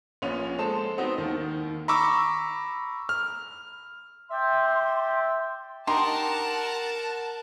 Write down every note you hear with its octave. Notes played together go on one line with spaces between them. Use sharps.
A#1 A#2 B3 C#4 F7
G#3 A4 C5 A5 E7
B3 C4 D#4 F#4
D#2 D#3
A#5 B5 C#6 D6 E6
F6
D5 E5 G5 C6
D4 D#4 G4 A#4 F#5 A5 A#5 C6